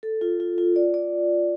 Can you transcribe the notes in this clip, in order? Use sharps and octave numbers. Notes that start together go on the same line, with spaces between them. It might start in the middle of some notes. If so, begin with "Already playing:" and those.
A4
F4
F4
F4
D5
D5